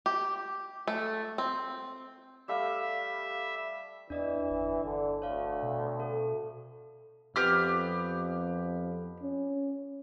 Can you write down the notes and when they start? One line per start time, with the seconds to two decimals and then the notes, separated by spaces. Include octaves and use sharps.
0.06 G4
0.87 A3
1.38 C4
2.48 G3 A3 E5 F5
4.10 E2 E3 D4 D5 D#5
4.50 G1
4.84 D3
5.22 D2 C#5 F5
5.62 B2
6.00 A4
7.36 F2 B3 G4 F6
9.22 C#4